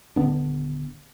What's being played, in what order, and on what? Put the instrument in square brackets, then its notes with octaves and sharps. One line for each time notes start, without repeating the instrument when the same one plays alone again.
[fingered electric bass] D#1 D3 B3 D4